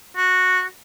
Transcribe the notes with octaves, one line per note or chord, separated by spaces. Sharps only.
F#4